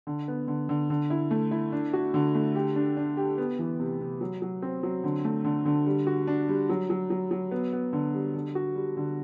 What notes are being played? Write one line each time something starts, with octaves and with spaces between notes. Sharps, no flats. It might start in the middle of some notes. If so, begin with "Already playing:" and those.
D3
B3
D3
D3
D3
E4
A3
E4
D4
F#4
D3
A3
G4
D4
D4
G4
B3
E3
C3
C3
F#3
F#3
C4
F#3
D3
A3
D3
D3
G3
F#4
D4
G3
F#3
F#3
F#3
F#3
B3
B3
D3
G3
D3
F#4
G3
D3